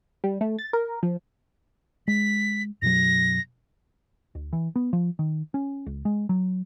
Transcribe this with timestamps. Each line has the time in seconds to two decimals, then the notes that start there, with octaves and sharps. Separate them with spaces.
0.24 G3
0.41 A3
0.59 A6
0.73 A#4
1.03 F3
2.08 G#3 B6
2.82 F#2 B2 F#3 A#6
4.35 D2
4.53 E3
4.76 B3
4.93 F3
5.19 D#3
5.54 C#4
5.86 C#2
6.05 G#3
6.29 F#3